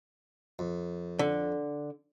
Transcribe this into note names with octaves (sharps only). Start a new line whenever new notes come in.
F2
D3